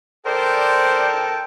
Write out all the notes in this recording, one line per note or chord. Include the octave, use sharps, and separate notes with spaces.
A4 A#4 C5 D5 G5